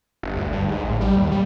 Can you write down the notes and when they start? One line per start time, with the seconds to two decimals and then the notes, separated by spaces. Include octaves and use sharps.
0.23 G1
0.36 D2
0.53 G2
0.68 G#2
0.84 A1
1.01 G3
1.16 D#2
1.32 G3